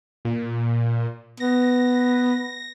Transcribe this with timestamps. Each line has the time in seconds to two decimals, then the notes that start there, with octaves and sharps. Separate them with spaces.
0.25 A#2
1.40 B3 A#6